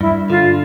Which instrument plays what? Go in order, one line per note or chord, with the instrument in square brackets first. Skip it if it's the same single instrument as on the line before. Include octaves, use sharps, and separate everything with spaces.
[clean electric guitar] G2 [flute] E4
[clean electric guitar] D3 [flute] F4